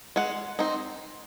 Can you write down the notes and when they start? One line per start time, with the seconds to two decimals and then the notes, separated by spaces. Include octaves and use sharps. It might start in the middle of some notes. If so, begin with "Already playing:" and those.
0.16 G#3 F#5
0.59 C4 D#4